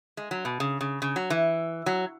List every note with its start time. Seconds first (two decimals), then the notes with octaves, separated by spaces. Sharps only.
0.17 G#3
0.31 F#3
0.45 B2
0.60 C#3
0.81 C#3
1.02 C#3
1.16 F#3
1.30 E3
1.86 F#3